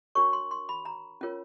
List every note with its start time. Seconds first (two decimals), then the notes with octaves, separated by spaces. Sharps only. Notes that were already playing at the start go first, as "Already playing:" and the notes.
0.15 D4 F#4 A#4 C#5 C#6
0.33 C6
0.51 C6
0.69 B5
0.85 A#5
1.21 C#4 F4 A#4 C#5